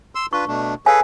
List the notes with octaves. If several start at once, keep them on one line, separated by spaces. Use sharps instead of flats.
C6 E6
D4 F4 B4 C#6
B2 A3 D4
G#4 A4 B4 C#5 F5 G#5